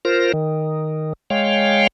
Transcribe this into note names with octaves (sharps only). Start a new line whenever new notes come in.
F4 A#4 C5 A#6
D#3
G#3 C#5 F5 G5